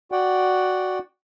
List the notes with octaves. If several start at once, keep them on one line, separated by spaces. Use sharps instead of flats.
F#4 D5 F#5 G5